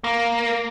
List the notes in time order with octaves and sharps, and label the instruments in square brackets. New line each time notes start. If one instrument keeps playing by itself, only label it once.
[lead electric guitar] A#3